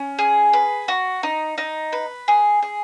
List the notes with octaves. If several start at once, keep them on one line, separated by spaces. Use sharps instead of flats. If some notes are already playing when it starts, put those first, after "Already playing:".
Already playing: C#4
G#4
B4
F#4
D#4
D#4
B4
G#4
G#4